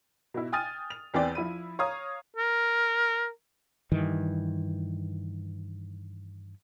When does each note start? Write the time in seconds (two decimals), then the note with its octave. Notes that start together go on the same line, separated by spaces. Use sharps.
0.34 B2 E4
0.52 G5 G#5 D#6 F6 A6 D#7
0.90 F7
1.14 E2 E3 C4 D5 G5
1.35 F3 E4 B5 D#7
1.79 C#5 F5 A#5 D#6
2.36 A#4
3.92 G2 D#3 E3